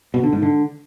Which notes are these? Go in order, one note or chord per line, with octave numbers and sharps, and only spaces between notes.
B2
D3
G#2
D3